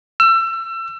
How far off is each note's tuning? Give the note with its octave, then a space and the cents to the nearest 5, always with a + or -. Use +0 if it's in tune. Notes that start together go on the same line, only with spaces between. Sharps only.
E6 +30